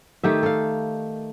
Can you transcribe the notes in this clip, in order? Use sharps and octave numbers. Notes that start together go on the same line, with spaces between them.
D#3 A3 G4 E5
A4 F5